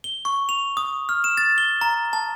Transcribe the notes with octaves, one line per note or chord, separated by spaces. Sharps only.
G7
C#6
F7
D#6
F6
E7
A6
G7
A#5
A5